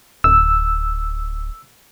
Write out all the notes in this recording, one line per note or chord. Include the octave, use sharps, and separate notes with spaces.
D1 E6